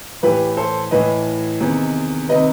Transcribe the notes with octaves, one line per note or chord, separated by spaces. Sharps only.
A2 E3 G4 B4
A4 C5
A2 E3 B4 D#5
E2 C3 D#3
C3 D#3 B4 D#5